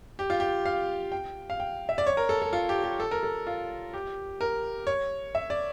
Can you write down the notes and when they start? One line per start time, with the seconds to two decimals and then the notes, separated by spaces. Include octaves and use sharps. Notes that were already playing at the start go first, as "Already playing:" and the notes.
0.19 G4
0.30 F4
0.40 G4
0.65 F5
1.12 G5
1.50 F5
1.60 G5
1.89 E5
1.98 D5
2.07 C#5
2.17 A#4
2.29 A4
2.42 A4
2.53 F4
2.69 G4
2.84 G4
3.00 A4
3.11 A#4
3.23 A4
3.47 F4
3.93 G4
4.41 A#4
4.87 C#5
5.35 E5
5.50 D5